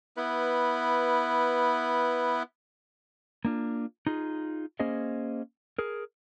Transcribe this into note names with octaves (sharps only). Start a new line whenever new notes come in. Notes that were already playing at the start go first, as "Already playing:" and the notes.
B3 E4 B4
A#3 D4 F4
D#4 F4 G#4
A#3 C#4 G#4 C5 D#5
G#4 A#4